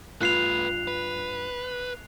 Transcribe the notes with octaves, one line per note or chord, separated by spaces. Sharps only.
G2 A3 F4 B4 F#6 C7 F7
B4